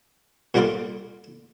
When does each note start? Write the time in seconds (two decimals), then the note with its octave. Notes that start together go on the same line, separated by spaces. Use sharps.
0.54 A#2 G3 A#3 D4 F4 A4